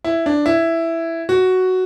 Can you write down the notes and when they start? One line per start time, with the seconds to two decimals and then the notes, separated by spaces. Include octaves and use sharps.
0.04 E4
0.26 D4
0.46 E4
1.29 F#4